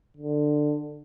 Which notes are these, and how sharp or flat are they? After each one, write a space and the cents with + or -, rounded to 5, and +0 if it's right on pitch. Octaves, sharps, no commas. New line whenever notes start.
D3 +15